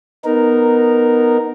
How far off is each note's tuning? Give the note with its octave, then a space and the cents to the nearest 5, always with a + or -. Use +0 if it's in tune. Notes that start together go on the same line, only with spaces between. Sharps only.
B3 +0 D#4 -10 A#4 +0